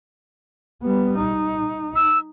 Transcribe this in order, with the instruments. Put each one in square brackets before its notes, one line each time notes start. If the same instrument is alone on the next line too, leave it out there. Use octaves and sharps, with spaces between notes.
[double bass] G3 B3
D#4
[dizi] E6